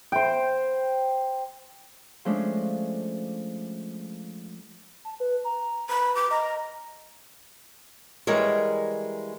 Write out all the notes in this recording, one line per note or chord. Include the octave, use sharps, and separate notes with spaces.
C5 G5
F3 G#3 A3 C#4 D4
A5
B4
A#5
B4 B5
D6
D#5 A#5
E3 G3 G#3 A#4 C#5